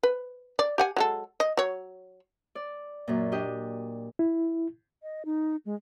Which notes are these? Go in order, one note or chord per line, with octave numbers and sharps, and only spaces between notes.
B4
D5
G4 F#5 G#5
F#3 G#3 A4
D#5
F#3 C#5
D5
F#2 A#2
D4 G4 D#5
E4
D#5
D#4
G#3